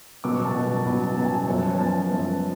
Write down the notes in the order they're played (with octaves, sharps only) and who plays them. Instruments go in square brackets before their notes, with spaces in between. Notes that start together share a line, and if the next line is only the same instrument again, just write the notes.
[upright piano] B2 F#3 B3 D6
C#6
A5
B2 F#3 B3
A5
B2 F#3 B3 B5
A5
B2 F#3 B3 A5
G#5
A5
F#2 F3 B3 C#5
B4
C#5
G#5
F#2 F3 B3 A5
F#2 F3 B3